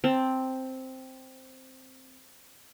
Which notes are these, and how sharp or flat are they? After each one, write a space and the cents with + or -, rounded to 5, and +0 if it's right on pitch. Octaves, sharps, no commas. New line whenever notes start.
C4 +0 A5 +15